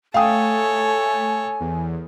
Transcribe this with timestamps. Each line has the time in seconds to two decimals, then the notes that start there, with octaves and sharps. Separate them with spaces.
0.14 A3 A4 C#5 F5 G5 G#5 D#6
1.60 E2